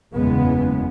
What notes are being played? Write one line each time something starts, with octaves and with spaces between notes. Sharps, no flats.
F#1 E2 C#3 G#3 B3